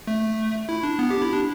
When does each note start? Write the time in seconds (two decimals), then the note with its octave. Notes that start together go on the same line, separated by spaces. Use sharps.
0.07 A3
0.69 E4
0.83 D4
0.99 B3
1.10 G4
1.22 E4
1.33 D4